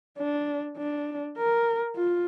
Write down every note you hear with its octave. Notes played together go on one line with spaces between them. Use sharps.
D4
D4
A#4
F4